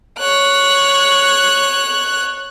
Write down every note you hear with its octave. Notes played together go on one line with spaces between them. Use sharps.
C#5 F#6